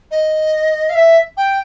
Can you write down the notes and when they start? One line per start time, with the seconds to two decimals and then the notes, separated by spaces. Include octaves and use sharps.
0.11 D#5
0.89 F5
0.95 E5
1.37 G5